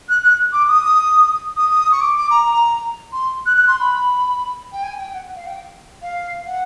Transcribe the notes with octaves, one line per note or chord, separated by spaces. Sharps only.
F#6
F#6
D6
D#6
D#6
C#6
D6
D6
A#5
A#5
C6
F#6
F#6
C6
B5
G5
G#5
G5
F#5
F5
G5
F5
F#5